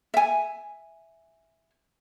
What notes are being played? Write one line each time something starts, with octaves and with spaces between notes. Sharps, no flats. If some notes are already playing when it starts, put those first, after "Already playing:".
E5 G#5